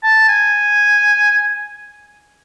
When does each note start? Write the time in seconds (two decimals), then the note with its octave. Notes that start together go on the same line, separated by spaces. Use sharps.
0.03 A5
0.28 G#5